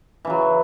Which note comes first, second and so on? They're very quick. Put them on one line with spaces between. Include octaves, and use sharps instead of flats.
E3 C#3 F#3